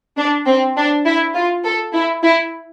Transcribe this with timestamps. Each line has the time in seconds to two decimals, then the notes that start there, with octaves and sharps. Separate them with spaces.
0.17 D4
0.47 C4
0.76 D4
1.06 E4
1.34 F4
1.64 A4
1.93 E4
2.23 E4